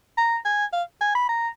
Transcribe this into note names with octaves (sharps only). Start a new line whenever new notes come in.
A#5
G#5
F5
G#5
B5
A#5